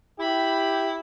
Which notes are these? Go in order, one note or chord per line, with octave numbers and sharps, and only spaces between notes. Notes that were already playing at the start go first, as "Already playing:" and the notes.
E4 G4 B5